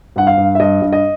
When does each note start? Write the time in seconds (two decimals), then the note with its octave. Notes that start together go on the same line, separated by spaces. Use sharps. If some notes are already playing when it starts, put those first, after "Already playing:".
0.16 G2 F#5
0.27 F5
0.37 G2
0.55 E5
0.60 G2 D#5
0.82 G2
0.93 D#5